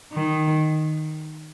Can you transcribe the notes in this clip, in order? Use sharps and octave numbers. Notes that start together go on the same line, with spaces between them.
D#3